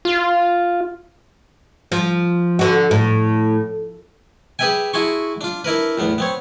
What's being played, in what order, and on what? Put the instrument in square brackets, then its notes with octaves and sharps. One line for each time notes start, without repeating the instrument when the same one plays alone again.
[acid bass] F4
[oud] F3
D3 F#4
A2
[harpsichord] G4 G#4 B4 E5 G5 G#5
E4 F#4 G#4 A5 C6 C#6
D4 F4
D4 E4 A#4 B4
E2 A2 B3
B3 C4 C#5